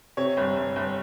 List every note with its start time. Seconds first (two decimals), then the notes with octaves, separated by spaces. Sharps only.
0.17 C3 C#5
0.37 G1
0.56 G1
0.76 G1